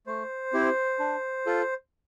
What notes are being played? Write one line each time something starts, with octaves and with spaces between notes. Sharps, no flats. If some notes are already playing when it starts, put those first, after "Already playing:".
A3 C5
C4 E4 G4
D4
F4 A4